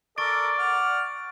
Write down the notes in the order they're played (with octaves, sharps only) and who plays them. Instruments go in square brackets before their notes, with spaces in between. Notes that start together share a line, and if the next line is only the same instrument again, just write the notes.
[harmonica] A4 A#4 [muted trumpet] D5 [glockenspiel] C#6 A6 D7
[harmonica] F#5 F6